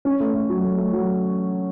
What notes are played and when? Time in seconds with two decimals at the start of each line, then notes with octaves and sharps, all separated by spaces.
0.05 C#4
0.20 A3
0.34 A3
0.49 F#3
0.64 A3
0.77 A3
0.93 F#3